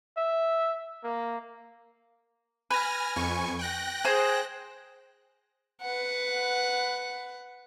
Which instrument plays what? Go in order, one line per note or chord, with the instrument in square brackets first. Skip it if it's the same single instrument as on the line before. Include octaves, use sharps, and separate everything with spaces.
[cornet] E5
A#3
[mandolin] B4 [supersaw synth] G#5 F6 A#6
[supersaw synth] F2 G#5 C#6
G5 F#6 A#6
[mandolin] G#4 C5
[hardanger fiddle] B4 F#5